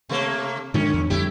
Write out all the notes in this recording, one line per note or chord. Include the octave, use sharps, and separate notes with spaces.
C3 A3 A#3
G#2 D3 D#3 F3 C#4
E2
F2 D3 G3 E4 G4